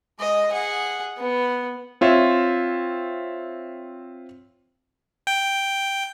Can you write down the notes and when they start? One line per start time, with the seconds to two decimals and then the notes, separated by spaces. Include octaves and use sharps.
0.19 G#3 D#5
0.51 G#4 F#5
1.18 B3
2.01 C4 F4 C#5 E5
5.27 G5